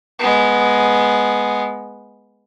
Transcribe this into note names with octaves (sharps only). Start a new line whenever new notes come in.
G#3 B3